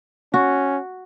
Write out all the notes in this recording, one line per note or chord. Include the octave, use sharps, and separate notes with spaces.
C#4 F#4